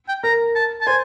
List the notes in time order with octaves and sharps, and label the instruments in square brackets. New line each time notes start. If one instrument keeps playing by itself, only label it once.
[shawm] G5
[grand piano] A#4 [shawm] A#5
[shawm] A5
A5
[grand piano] C5 [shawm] G#5